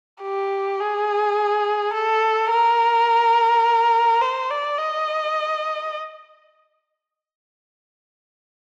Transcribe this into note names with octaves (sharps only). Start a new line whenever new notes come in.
G4
G#4
A4
A#4
C5
D5
D#5